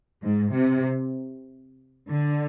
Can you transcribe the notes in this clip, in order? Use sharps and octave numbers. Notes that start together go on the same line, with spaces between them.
G#2
C3
D3